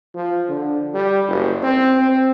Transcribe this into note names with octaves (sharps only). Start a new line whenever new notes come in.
F3
D3
G3
F#1
C4
C4